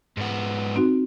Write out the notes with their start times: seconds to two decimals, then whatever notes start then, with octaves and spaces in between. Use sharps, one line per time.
0.17 G#2 B3
0.76 C4 D#4 F#4